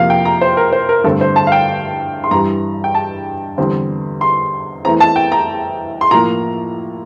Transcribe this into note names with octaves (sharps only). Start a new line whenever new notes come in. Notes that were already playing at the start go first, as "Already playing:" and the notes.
Already playing: F2 C3 F3 A#3 F5
G5
A#5
C5
A#4
C5
A#4
G2 D3 A3 C4 A4
C5
A5
F5
G5
C6
G2 E3 G3 A#5
G5
A5
E2 D3 G3 C4
C6
E2 E3 A3 C4 A#5
A5
G5
A#5
C6
A2 F3 A#3 A#5